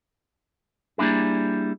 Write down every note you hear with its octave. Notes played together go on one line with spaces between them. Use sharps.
G3 A#3 D4 E4 G#4